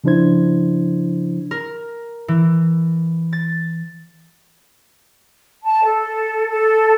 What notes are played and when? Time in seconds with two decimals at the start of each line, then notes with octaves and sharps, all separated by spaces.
0.04 C#3 F3 D4 E4 C5 G#6
1.51 A#4
2.28 E3
3.33 A6
5.63 A5
5.84 A4
6.49 A4